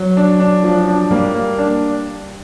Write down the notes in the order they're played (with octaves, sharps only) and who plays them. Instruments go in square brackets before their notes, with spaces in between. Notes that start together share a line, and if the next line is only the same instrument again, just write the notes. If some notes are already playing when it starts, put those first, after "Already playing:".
Already playing: [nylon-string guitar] F#3
[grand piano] D4
D4
F3
D4
[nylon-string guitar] G3 [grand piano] A#3
[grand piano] A#3
D4